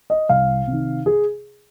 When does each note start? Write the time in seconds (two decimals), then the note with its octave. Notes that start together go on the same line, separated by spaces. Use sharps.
0.10 D#5
0.29 C2 F5
0.67 C3 D#3
1.06 G#4